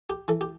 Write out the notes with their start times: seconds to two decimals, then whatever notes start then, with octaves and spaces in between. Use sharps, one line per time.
0.10 G4
0.28 E3 A4
0.41 G4